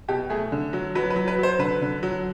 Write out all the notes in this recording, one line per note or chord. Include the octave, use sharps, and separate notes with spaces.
B2 G4
A3 G#4
D3
F#3
F#3 B4
B4
F#3
B4
F#3 C5
D3 B4
D3
F#3